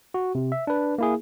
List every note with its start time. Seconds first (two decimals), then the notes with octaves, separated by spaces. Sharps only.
0.14 F#4
0.35 C3
0.52 E5
0.67 D4 B4
0.98 A#3 E4 G#4